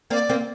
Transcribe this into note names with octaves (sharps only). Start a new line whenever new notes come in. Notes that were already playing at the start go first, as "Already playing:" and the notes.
A#3 C4 D5
A#3 C4